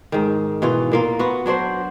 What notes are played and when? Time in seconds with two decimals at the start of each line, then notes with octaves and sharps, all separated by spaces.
0.12 G#2 D#3
0.62 B2 E3 F4
0.92 A#2 A#3 F4
1.19 B3 F4 F#4 F#5
1.46 F#3 D4 F#4 C5